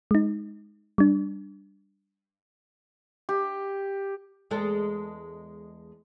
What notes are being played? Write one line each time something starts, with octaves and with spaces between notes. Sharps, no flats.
G#3 D#4
G3 D4
G4
E2 G#3 A4